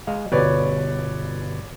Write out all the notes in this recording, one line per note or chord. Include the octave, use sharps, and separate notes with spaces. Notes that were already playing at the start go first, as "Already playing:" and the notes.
G#3 F5
G1 B2 B4 C#5 D5